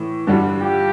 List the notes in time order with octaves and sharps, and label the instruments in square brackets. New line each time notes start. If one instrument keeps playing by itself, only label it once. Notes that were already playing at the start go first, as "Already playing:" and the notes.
Already playing: [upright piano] A2 E3
[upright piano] G2 D3 G3 [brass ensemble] E4 F#4
[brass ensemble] F4 G4